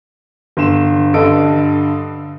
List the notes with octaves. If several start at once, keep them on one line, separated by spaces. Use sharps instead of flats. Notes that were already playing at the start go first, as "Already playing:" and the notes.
G1 C6 E7
G2 D3 A4 D#5 D7